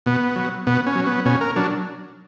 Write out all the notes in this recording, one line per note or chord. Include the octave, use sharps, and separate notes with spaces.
B2 B3
F#3
B2 B3
C#4
F#3
B3
B2 C#4
A#4
F#3 D4